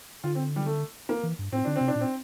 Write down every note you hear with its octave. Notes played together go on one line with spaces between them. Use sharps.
D3 F4
C4
G3
A3
A#3
E3
G2
A2 C4
D3 D4
C4
C3
D4
A#2
C4